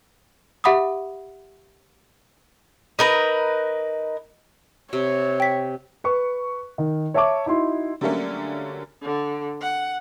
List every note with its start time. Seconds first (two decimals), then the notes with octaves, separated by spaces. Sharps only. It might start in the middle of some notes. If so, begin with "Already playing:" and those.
0.64 G4 E5 F#5 B5 D6 D#6
2.99 D#4 A#4 B4
4.93 C3 C#5
5.40 G5 B6
6.04 B4 C#6
6.78 D#3
7.14 C#5 E5 A5 C#6 D6
7.46 D#4 E4 F#4 C6
8.01 D3 F#3 G3 A3 A#3 C#4
9.02 D3
9.61 F#5